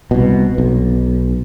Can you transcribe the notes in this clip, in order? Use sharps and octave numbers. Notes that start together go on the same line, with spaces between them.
C2 B2
B1